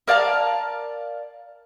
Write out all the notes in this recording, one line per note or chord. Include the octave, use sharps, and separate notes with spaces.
A#4 D5 F5 A5